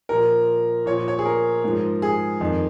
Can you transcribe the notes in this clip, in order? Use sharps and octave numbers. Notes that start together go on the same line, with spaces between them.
A#2 F3 A#4
A#2 F3 C#5
C#5
G#4
A#4
G#2 F3
G#4
F2 D#3